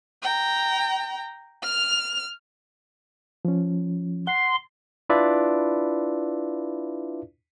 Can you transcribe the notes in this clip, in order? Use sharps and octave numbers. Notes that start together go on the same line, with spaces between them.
G5 A#5
F6 F7
F3 C#4
F#5 C6
D4 E4 F4 B4 D5 E5